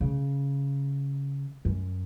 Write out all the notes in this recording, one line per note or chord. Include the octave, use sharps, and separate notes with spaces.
C#3
F#2